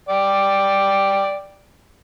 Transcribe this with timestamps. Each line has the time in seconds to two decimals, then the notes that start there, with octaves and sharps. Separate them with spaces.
0.09 D5 G5